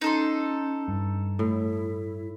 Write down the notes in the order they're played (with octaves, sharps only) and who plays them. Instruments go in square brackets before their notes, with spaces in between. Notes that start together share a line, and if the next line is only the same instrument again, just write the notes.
[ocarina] C#4 [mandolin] D#4 A4 C6
[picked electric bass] G2
[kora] A2 [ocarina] E4